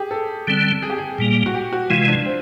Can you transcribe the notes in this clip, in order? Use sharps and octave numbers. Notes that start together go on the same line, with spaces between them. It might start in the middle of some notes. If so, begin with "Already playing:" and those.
Already playing: G4 G#4
A4
D3 G3 C4
G#4
G4
G#4
A#2 G3 A#3
F#4
G4
F#4
C3 E3 G#3 F4
D4
C4